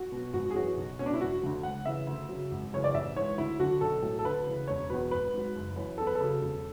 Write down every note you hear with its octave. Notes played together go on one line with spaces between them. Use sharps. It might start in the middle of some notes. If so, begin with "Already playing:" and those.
Already playing: F#4
B2 F#3
G#1 F#4
G#4
F#2 E3 F#4
B1
B2 F#3 C#4
D4
E4
E1 F#4
D2 D3 F#3
C#2 F#5
C#3 E3 E5
D2
C#3 F#3
G#1
F#2 C#3 E3 C#5
D5
A1 E5
G#2 E3 C#5
D2 E4
D3 F#3 F#4
B1 A4
A2 F#3
A4
D2 B4
C#3 E3
E1 C#5
E2 B2 F#3 B4
G#1 B4
G#2 F#3
F#1
F#2 E3
E2 A4
B4
A4
C#3 F#3
E1